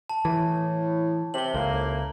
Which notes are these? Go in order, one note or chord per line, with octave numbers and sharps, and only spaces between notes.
A5
A2 E3
C3 F#7 G7
C#2 A2 A#3